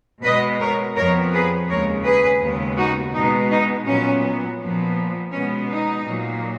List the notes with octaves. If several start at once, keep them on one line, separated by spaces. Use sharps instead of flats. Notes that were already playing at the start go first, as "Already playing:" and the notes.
B2 G#3 B3 B4 D#5
A#4 C#5
F2 F3 B3 A#4 C#5
G#4 B4
D#2 C#3 G#3 A#4 C#5
G#4 B4
D#2 C#3 G#3 B3
D#4 F#4
B2 G#3 B3 D#4
D#4
A#2 F#3 B3 C#4
A#2 F3 B3
B2 G#3 B3 C#4
D#4
A#2 F#3 A#3